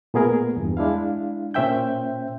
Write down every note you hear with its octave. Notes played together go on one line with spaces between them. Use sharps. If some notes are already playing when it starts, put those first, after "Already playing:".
A#2 A3 B3 G#4 A#4
E2 G2
G#3 D4 E4 F5
A#2 C#4 C5 E5 G5 G6